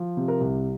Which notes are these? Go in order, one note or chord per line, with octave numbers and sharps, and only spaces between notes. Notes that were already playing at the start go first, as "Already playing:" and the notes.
Already playing: F3
C3
A#4
C2